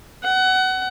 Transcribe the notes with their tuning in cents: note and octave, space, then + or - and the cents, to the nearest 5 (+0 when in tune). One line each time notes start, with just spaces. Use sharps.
F#5 +25